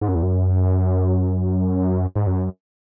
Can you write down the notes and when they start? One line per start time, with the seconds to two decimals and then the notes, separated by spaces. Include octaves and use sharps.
0.01 G#2
0.08 F#2
0.15 E2
0.23 F#2
2.15 G#2
2.27 F#2